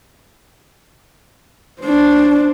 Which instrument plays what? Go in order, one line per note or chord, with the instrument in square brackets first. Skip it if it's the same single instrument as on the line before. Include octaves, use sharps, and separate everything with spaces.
[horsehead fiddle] D4 C5